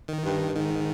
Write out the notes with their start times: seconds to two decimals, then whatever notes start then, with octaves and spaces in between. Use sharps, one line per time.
0.08 D#3
0.25 G2
0.55 G#2 D#3